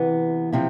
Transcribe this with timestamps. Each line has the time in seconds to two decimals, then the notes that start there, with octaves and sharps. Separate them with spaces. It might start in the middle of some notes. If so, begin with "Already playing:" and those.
Already playing: C3 E3 B3
0.52 C3 F3 C4 E4